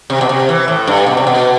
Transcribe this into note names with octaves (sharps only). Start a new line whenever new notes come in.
C3
B2
C3
E3
A2
G2
B2
C3
B2